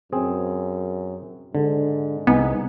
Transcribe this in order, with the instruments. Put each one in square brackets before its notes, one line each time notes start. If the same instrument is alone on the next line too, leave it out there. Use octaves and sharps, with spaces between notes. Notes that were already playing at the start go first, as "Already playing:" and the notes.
[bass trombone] F#2 [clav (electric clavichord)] C4 G#4
[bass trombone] G#2 [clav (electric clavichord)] D3
[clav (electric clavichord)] C2 D#4 G#5 [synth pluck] B3